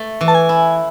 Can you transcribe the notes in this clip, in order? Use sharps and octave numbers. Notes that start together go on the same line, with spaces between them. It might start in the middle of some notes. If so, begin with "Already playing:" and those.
Already playing: A3
E3
A5
G#5
E4